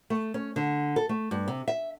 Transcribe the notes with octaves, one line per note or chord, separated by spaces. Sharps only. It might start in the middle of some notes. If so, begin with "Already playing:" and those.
A3
C#4
D3
A4
A3
G2
C3
E5